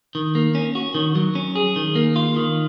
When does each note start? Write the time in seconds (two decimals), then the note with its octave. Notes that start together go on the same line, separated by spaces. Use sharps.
0.15 D#3
0.35 A#3
0.55 C#4
0.75 F#4
0.94 D#3
1.15 F#3
1.35 C#4
1.55 G#4
1.76 D#3
1.95 A#3
2.16 F4
2.36 D#3